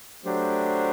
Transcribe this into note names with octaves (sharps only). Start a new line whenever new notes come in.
F#3 A3 D4 G4 C5